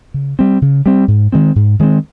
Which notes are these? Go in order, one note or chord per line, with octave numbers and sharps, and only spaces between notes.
C#3
G3 C4
C#3
G3 C4
G#2
D#3 G#3 C4
G#2
D#3 G#3 C4